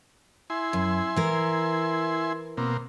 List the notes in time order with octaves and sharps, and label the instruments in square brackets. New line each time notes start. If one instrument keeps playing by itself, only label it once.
[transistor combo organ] E4 G#5 C6
[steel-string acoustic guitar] F#2
E3 A#4
[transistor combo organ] B2 A#3 C4